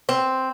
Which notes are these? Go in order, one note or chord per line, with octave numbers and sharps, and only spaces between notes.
C4